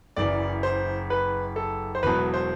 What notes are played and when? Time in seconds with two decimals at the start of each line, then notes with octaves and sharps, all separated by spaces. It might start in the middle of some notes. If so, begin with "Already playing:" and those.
0.17 F#1 F#2 E3 D5
0.63 C5
1.10 B4
1.56 A4
1.95 C5
2.03 E1 E2 B2 F#3 B4
2.34 C5